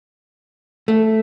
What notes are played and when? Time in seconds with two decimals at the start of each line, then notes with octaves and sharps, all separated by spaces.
0.88 A3